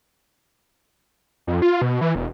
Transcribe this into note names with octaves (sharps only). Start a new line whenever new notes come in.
F2
F4
B2
E3
E1